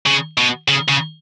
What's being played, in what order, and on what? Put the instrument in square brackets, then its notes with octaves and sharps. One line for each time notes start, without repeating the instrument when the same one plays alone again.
[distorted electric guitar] C#3
B2
C#3
C#3